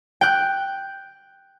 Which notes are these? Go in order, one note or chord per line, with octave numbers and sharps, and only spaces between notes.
G5 F#6